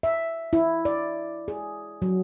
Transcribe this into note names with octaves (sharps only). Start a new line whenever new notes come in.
E5
E4
D5
G#4
F#3